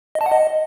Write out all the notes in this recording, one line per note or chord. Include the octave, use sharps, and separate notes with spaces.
D#5
A5
F#5
D#5